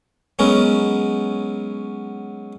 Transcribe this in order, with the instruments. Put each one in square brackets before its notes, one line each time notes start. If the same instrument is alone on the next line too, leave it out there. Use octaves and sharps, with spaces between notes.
[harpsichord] F#3 G#3 B3 C#4 A#4